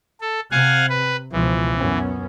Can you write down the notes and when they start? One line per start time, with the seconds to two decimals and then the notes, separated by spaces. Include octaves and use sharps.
0.21 A4
0.51 C3 F5 F#5 G#5
0.89 B4
1.32 C#2 B2 E3 F3
1.76 F#2 B3 C#4